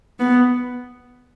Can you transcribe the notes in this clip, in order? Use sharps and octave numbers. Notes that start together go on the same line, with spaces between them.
B3